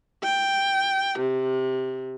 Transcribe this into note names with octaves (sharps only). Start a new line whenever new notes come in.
G5
C3